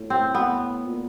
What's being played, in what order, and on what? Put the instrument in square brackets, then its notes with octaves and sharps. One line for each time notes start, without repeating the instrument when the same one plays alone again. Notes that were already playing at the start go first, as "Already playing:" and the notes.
Already playing: [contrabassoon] A2
[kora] C4
B3
[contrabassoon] A#2